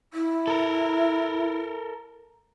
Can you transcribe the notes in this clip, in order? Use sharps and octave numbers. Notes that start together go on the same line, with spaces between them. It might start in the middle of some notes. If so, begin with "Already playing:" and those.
E4
A4 A#4